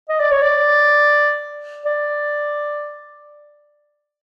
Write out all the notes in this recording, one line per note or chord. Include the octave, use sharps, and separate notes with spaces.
D#5
D5
C#5
D5
D5